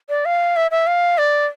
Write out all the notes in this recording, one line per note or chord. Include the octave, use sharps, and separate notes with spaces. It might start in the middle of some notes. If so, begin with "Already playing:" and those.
D5
F5
E5
E5
F5
D5